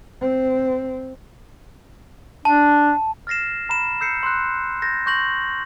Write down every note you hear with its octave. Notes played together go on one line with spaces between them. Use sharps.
C4
D4 A5
F6 A6 A#6 C7 E7
A#5 B5 E7
E6 G6 C7 C#7
C6 E6 F#6
G6 A6 A#6
C6 C#6 G6 A#6 F#7